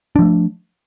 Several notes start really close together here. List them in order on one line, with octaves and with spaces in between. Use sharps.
D4 F3 A3